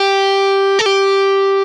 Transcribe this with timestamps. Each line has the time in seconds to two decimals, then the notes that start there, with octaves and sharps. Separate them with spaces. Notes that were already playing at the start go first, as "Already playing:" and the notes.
Already playing: G4
0.79 A4
0.86 G4